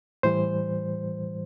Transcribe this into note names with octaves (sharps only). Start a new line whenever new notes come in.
A2 E3 G3 C5